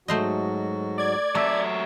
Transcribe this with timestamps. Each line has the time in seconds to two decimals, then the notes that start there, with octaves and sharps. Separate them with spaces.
0.08 G#2 F#3 A3 F#4 C5 D#5
0.98 D5 G#6
1.35 F#3 A3 E5